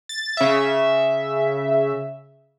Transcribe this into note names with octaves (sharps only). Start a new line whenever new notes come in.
A6
C#3 E5